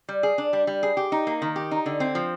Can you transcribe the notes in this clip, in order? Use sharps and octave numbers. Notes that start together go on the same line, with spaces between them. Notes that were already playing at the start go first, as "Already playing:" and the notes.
G3
G#4
D4
G3
G3
G#4
G4
D#4
A#3
D#3
G4
D#4
D3
C4
F3